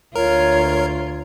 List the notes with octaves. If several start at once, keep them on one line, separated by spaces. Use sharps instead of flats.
D2 F4 A#4 C#5